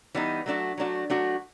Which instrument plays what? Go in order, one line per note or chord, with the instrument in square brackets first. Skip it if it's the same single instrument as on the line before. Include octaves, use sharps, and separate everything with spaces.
[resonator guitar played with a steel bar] E3 G3 B3 D#4
F#3 A3 D4 F#4
F#3 A3 D4 F#4
F#3 A3 D4 F#4